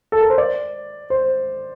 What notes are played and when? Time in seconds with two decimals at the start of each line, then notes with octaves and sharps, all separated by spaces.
0.12 A4
0.21 A#4
0.30 C5
0.38 D5
1.10 C5